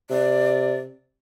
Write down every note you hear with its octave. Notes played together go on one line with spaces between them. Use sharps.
C3 D5